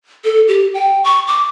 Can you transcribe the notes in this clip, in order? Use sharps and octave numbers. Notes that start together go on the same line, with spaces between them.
A4
G4
G5
C#6
D6